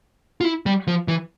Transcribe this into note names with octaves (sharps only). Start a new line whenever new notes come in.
F4
E4
G3
F3
E3